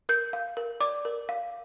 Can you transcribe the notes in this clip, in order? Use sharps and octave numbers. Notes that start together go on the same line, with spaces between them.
A#4 G6
F5
A#4
D5 D6
A#4
F5